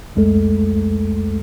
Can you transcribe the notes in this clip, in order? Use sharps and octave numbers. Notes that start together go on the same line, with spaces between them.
C2 F2 G#3 A3 A4